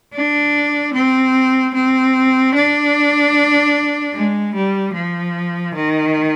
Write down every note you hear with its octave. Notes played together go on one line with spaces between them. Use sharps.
D4
C4
C4
D4
G#3
G3
F3
D#3